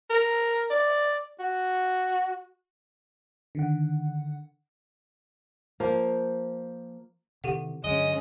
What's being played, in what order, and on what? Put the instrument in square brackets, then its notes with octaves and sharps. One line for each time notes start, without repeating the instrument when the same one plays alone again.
[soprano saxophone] A#4
D5
F#4
[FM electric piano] D3 D#3 F#5
[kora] F3 A#3
[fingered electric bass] C3 D#3 E3 [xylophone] G4 A4 F#5
[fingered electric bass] G2 D3 F#3 [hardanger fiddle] G#3 C#4 [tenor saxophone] D#5